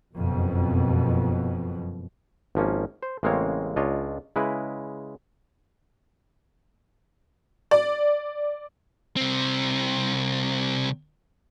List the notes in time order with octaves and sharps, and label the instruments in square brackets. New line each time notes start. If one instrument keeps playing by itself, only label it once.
[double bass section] F#1 F2 B2
[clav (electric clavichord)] G#1 F3 A#3 C#4
C5
A1 C#3 G#3 A#3 C4 C#5
C#2 D4 F4 C#5 D#5
C#3 G#3 E4 B4
[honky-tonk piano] D5
[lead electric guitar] C2 C4